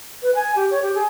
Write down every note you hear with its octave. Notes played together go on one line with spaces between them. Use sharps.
B4
G#5
G4
C#5
G4
G#4